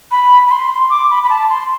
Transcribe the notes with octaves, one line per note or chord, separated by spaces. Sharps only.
B5
B5
C6
D6
B5
B5
A5
C6